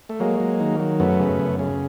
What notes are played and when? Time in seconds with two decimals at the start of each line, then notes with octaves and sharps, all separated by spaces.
0.09 A3
0.20 F#3 G#3 A#3
0.40 F#3
0.60 D#3
0.80 F#3
1.00 F#2 A3 B3
1.19 C#3
1.40 F#2
1.59 C#3